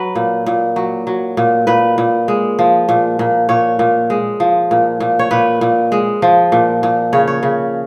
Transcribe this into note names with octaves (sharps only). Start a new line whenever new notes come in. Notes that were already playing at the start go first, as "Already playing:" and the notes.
Already playing: F#3 B4
A#2
A#2
F#3
F#3
A#2
A#2 B4
A#2
G#3
F3
A#2
A#2
A#2 C#5
A#2
G#3
F3
A#2
A#2
C#5
A#2 B4
A#2
G#3
F3
A#2
A#2
C#3 C#5
C#5
C#3